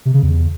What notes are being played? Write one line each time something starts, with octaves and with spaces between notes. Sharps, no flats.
C3
C#3
E2